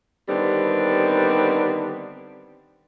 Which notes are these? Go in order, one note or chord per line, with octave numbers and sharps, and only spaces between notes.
D3 D#3 G3 B3 C4